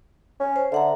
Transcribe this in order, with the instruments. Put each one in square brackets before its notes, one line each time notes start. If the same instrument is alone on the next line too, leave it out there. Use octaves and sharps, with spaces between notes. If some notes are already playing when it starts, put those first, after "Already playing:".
[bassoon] C#4
[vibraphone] C5
[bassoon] D3 [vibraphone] E5 F#5 A#5